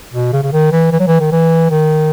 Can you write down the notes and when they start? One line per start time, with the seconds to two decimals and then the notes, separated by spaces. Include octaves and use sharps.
0.13 B2
0.33 C#3
0.43 C#3
0.52 D#3
0.72 E3
0.92 E3
1.00 F#3
1.07 E3
1.20 D#3
1.32 E3
1.70 D#3